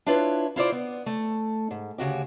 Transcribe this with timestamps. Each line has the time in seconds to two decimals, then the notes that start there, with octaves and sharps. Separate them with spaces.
0.06 D4 E4 F4 B4 C#5
0.56 E4 F4 C5 D5
0.72 B3
1.06 A3
1.71 G#2
1.98 D2 C#3 F#4 G4